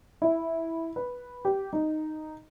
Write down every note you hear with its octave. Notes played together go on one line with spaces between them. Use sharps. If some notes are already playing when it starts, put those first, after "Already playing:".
E4
B4
G4
D#4